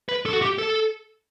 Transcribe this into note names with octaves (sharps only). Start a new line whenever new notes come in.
B4
A4
F#4
G4
A4